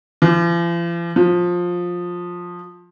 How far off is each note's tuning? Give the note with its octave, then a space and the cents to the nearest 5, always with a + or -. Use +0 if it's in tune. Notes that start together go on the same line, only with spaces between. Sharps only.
F3 -45
F3 +15